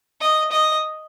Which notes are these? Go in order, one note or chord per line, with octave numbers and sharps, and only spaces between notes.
D#5
D#5